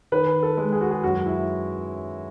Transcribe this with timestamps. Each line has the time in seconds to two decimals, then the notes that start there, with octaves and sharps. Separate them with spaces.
0.12 D#3 B4
0.43 A4
0.57 G#3
0.72 G#4
0.81 F#4
0.91 G#4
1.04 F#2 F#4
1.26 E4